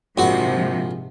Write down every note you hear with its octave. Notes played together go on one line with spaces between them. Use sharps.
A#1 G#2 C3 F3 F#4 F#5